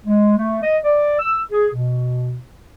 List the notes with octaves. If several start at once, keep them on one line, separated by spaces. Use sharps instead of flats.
G#3
A3
D#5
D5
E6
G#4
B2